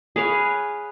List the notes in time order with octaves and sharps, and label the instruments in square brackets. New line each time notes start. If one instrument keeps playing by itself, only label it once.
[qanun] G#4 B4 C#5 F5